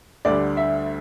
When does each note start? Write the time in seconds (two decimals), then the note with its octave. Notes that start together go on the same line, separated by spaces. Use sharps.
0.25 D2 D3 G3 D5
0.57 E5